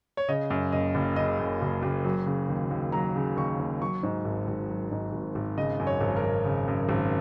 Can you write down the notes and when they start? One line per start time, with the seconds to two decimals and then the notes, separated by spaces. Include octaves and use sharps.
0.17 C#5
0.28 C#3 D#5
0.50 F#2
0.72 F#1 D#5
0.95 F#1
1.16 C#3 D#5
1.40 F#2
1.62 F#1
1.83 F#1
2.04 F#3
2.26 C#3
2.49 D#2
2.71 D#2
2.92 F#3 A#5
3.16 C#3
3.37 D#2 C#6
3.59 D#2
3.82 F#3 C#6
4.03 G#2
4.25 G#1
4.48 G#1
4.69 F#3
4.91 G#2
5.13 G#1
5.35 G#1
5.57 C#3 D#5
5.80 F#2
5.87 C#5
6.01 G#1
6.16 A#4
6.24 G#1
6.45 C#3
6.68 F#2
6.89 G#1